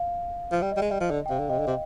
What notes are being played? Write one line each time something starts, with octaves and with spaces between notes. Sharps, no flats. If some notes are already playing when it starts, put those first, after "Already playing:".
Already playing: F5
F3
G3
D#5
G3
G#3
G3
F3
D3
G5
C3 F5
D3
C3 D#5 G5
D3
C3